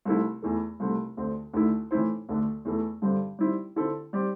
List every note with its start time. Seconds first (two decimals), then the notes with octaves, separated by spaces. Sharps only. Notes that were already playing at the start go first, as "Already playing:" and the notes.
0.05 C2 C3 A3 E4
0.42 E2 E3 A3
0.80 C2 C3 A3
1.17 D2 D3 C4
1.53 D2 D3 A3 E4
1.91 A2 E3 C4 E4 C5
2.29 D2 D3 A3 D4
2.65 E2 E3 A3
3.02 G2 D3 G3 C4
3.39 G3 C4 E4
3.76 D3 C4 E4 A4
4.13 G3 C4 G4 D5